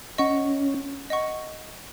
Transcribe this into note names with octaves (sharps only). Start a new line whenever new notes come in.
C#4 D#5 F#5 C#6
D#5 F#5 C#6